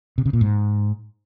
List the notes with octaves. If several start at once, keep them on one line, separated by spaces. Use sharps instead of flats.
C3
C#3
A#2
G#2